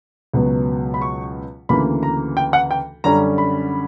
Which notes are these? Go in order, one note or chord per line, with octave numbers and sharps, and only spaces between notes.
C#2 B2 F#3 B3
B5
C#6
D2 C#3 E3 A#3 B5
A#5
G5
F#5
G5
F#2 D3 G3 C#4 A#5
B5